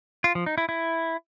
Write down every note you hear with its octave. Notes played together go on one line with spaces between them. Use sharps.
F4
F3
D#4
E4
E4